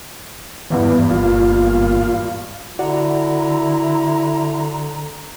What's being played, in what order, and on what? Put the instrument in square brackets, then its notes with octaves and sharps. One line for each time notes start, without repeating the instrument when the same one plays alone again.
[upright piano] G#1 E2 G2 [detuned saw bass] E3 [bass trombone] B3
[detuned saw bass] G1 [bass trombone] A#2 [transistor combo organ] F4
[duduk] D3 [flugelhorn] E4 [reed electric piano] F#4 D5 F#5 [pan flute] A#5